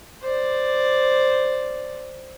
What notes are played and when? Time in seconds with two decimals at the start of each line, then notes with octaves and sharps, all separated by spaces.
0.22 C5 D5